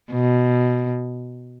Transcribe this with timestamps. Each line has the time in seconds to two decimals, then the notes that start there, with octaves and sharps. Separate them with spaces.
0.11 B2